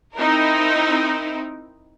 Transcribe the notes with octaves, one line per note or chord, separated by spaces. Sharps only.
C4 D#4 E4 A#4